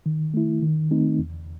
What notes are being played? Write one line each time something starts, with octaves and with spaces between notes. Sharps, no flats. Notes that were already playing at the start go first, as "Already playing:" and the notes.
D#3
A3 E4
D#3
A3 C4 D#4
E2